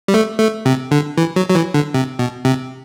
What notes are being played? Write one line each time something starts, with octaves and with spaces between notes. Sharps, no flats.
G3
A3
A3
C3
D3
E3
F#3
F#3
E3
D3
C3
B2
C3